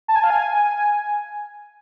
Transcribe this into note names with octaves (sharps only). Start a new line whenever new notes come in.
A5
G#5
F5
G#5